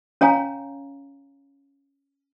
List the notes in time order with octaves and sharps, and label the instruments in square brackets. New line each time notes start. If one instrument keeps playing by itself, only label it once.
[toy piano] C#4 C#5 F5 G#5 A#5